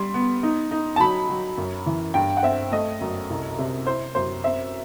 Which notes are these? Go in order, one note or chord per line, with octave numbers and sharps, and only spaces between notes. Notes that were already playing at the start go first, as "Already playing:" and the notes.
Already playing: G3 C6
B3
D#4
D#4
A5
F#3 B5
F#3
F#2
E3
G2 G5
F#5
C4 E5
A3 D#5
F#2
C2
C3
E4 C5
F#2 C5
C4 E5